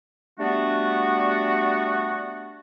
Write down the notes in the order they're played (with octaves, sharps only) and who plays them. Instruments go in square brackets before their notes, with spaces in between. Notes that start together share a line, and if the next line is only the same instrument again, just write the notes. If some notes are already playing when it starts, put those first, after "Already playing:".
[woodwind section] G3 A3 B3 D4 F#4